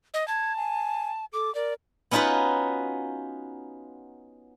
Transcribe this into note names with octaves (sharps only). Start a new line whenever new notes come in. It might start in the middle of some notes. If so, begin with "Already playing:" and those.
D#5
A5 G#6
G#5
A4 D6
A#4 D5
B3 C#4 D#4 F4 F#4 B4